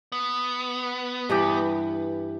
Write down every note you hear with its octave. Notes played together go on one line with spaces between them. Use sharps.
B3
G2 E3 G4